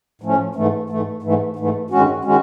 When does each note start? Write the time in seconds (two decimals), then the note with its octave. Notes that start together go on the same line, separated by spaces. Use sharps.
0.21 A2 F3 A3 C#4
0.55 G#2 E3 A3
0.90 G#2 E3 A3
1.22 G#2 E3 A3
1.56 G#2 E3 A3
1.90 G2 D#3 G#3 C#4 F#4
2.25 D#3 G#3 C#4 F#4